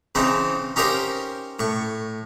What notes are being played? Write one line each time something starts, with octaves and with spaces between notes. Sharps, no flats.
C#3 E3 C4 D#4
C#4 D#4 G4 A#4 C5 F5
A2 C#6